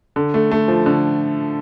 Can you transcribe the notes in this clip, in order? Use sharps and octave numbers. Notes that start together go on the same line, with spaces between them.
D3
A3
A3
F3
D3